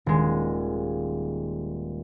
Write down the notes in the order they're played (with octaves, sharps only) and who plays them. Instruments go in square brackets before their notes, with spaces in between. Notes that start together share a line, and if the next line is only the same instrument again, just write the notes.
[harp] D#1 G#3